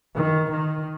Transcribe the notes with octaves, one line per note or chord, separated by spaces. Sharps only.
D#3
D#3